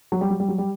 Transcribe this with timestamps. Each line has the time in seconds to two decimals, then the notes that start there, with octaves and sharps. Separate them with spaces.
0.12 F#3
0.21 G3
0.30 F#3
0.40 G3
0.48 F#3
0.58 G3